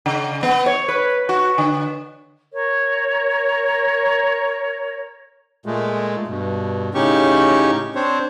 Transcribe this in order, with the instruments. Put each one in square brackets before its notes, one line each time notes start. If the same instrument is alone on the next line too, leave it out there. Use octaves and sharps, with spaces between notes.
[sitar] C#3
B3
C#5
B4
F#4
D3
[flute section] A#4 C#5
[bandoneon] A#2 G#3 A3
G2 B2
A2 C#3 C#4 D#4 G4 C#6
C4 D4 C5 C#5